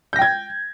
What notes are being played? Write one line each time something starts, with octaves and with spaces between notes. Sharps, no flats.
G5 G6 G#6 A#6